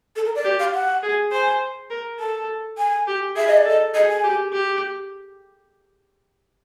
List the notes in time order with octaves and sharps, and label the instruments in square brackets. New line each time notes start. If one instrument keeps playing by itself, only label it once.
[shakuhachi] A4
A#4
D5
[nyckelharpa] G4
[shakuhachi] F5
F#5
[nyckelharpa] G#4
[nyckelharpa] C5 [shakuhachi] G#5
[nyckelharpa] A#4
[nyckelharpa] A4 [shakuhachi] A5
[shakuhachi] G#5
[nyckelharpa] G4
[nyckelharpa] G#4 [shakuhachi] E5
[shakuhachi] D#5
D5
[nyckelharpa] A4 [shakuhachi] D#5
[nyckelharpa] G#4 [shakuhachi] D#5
[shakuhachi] G#5
[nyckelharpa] G4
G4